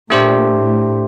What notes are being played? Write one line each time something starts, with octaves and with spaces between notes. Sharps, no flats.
A#2 A3 D4 G4 C5
A2